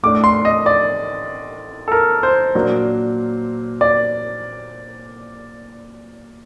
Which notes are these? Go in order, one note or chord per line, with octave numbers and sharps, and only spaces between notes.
A2 A3 D4 D6
C6
D#5
D5
A4
A#4
C5
A#2 F#3 A#3 D4
D5